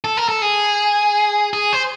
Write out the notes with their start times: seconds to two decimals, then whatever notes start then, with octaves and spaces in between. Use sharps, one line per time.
0.04 A4
0.17 A#4
0.29 A4
0.42 G#4
1.53 G#4
1.73 C5